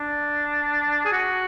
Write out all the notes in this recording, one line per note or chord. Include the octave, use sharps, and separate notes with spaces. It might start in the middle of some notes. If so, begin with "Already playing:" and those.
Already playing: D4
G#4
F#4